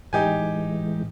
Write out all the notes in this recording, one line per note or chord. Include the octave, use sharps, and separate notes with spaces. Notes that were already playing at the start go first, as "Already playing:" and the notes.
A2 E3 G#3 D#4 G4 G#5